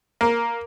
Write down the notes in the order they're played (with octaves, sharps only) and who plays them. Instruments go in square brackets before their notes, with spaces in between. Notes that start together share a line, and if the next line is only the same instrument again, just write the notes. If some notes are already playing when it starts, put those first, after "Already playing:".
[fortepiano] A#3